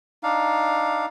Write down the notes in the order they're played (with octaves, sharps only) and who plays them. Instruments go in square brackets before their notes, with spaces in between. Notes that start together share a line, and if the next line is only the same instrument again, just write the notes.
[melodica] D4 D#4 F5